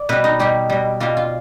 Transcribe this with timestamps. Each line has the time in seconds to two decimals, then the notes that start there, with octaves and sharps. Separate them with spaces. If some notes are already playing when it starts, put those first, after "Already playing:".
Already playing: D5
0.09 B2 G3 B4
0.24 D#4
0.39 B2 G3 G4
0.69 B2 G3
1.00 B2 G3 F4
1.17 F4